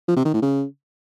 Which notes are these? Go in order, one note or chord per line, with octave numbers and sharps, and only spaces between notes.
F3
C3
D#3
A2
C#3